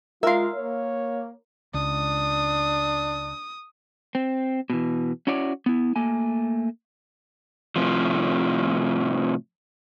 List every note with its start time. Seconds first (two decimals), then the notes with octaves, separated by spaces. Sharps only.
0.23 G#3 F4 A#4 E5 F5 C6
0.55 A#3 C#5
1.74 C#2 D4 D#6
4.15 C4
4.70 B2 E3
5.27 C#4 E4 F#4 C#5 D5
5.66 B3 E4
5.96 A3 A#3 G#5
7.76 A2 C3 F3